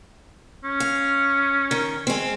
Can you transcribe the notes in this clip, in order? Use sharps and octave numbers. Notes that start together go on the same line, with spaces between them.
C#4
F5
D#3
G#3 C4